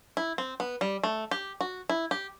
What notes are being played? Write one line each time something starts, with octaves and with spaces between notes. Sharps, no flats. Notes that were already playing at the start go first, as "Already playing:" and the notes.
E4
C4
B3
G3
A3
G4
F#4
E4
G4